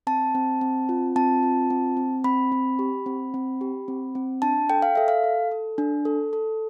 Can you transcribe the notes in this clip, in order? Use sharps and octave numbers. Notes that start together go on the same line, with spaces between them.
C4 A5
C4
C4
F4
C4 A5
F4
C4
C4
C4 B5
C4
G4
C4
C4
G4
C4
C4
D4 A5
A4 G5
F5
A4 E5
F5
A4
A4
D4
A4
A4